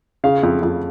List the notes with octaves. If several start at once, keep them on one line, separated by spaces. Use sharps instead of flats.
C#3 F5
F2
F2